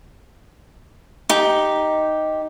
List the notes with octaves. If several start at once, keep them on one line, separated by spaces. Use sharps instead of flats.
D#4 G4